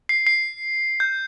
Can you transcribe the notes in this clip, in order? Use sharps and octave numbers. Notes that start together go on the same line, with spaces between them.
C7
C7
G6